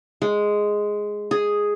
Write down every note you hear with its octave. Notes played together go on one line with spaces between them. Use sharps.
G#3
G#4